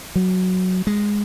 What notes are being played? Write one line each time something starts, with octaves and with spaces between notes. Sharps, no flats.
F#3
G#3